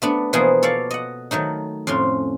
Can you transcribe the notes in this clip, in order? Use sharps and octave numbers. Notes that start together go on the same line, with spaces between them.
A3 B3 D4
B2 E3 F3 A#3 B3 G#4
A4 C#5 D5 F5
D#5 F#5
D#3 F#3 A3 D#4
F2 A2 C#4 C6